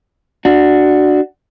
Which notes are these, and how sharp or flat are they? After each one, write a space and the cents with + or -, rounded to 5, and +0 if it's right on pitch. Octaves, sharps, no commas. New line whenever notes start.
D4 +10 F#4 +0